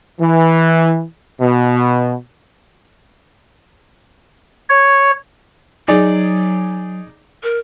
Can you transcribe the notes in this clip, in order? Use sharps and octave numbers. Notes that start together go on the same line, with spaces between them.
E3
B2
C#5
F#3 D#4 G#4 D5
A#4